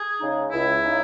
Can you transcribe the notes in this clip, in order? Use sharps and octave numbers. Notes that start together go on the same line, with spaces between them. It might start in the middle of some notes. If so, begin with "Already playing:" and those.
Already playing: G#4
C#3 G#3 D#4
C#2 E4
C#3 G#3 D#4